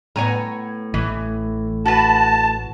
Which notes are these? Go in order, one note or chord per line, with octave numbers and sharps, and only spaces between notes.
A2 B3 C#5 G#5 A#5
A1 E3 A3
F#4 B4 A5